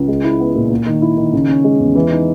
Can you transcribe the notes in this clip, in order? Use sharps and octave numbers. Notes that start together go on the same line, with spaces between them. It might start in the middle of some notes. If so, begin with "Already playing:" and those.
Already playing: C#2
G#3
E4
B3
A#2
A#3
D#3
E4
D#3
C#3
C#4
G#3
E2
E3
D#4